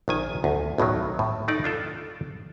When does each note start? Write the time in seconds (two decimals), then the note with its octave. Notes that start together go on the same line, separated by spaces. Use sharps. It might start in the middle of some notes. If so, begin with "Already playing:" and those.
0.08 A#1 D#3 G#5
0.44 D2
0.78 B1 A2 D#3 F#3
1.19 A2
1.48 A3 D#4 D5
1.64 D4 F4 A4